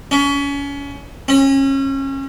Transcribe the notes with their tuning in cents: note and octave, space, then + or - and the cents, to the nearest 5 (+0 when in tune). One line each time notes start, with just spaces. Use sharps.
C#4 +30
C#4 -30